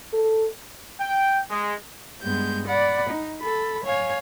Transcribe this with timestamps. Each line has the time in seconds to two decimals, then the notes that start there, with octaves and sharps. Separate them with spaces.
0.14 A4
1.00 G5
1.50 G#3
2.22 G2 G#3 B3 G6
2.66 D5 F#5 B5
3.09 D#4
3.41 A4 B5
3.84 C#5 F5 G#5